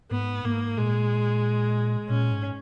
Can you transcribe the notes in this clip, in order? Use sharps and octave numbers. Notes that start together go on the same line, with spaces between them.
G#2 B3
G#2 A#3
A#2 G#3
A#2 C#4
G#2